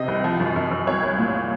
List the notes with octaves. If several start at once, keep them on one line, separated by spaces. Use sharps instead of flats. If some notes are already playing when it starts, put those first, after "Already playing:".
Already playing: C3 D#5
C2
F3
F#2
F#2
F#2
C2 C#5
C2
A#2